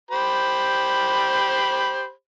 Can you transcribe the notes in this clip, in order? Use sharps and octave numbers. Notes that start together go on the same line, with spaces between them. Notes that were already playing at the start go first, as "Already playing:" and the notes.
G4 C5 B5